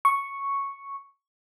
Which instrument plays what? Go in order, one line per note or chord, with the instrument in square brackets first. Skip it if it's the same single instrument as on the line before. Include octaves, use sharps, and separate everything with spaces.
[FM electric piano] C#6